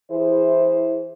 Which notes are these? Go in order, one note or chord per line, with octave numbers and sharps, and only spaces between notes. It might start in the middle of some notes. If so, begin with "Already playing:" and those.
E3 E4 G#4 C5